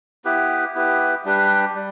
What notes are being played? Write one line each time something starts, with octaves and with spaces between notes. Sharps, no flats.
B3 E4 G4 B4
B3 E4 G4 B4
G3 D4 G4 B4
G3